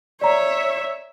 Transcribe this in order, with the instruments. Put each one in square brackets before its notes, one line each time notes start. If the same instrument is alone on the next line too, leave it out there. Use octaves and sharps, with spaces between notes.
[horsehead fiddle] C#5 E5 [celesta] D5 A#5